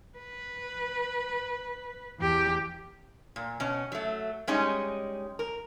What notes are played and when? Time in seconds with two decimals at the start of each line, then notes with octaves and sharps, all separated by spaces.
0.19 B4
2.19 E2 G4
3.36 A#2
3.60 B2 C#4
3.92 F#3 A3
4.47 G3 G#3 C#4 D#4
5.39 A#4